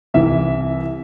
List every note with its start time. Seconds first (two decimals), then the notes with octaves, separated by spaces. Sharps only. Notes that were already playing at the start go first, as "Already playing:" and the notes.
0.14 C2 C3 E3 E5